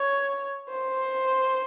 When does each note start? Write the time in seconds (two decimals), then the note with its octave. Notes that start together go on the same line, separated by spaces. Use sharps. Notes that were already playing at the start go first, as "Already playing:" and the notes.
Already playing: C#5
0.69 C5